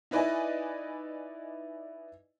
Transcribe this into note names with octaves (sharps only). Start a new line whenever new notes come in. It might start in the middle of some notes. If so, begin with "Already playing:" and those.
D#4 E4 B4 D5 D#5 G#5